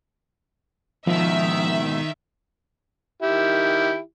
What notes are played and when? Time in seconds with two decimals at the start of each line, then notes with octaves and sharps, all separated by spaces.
1.07 G#2 B2 D#3 F3 E5
3.22 D#3 E4 G4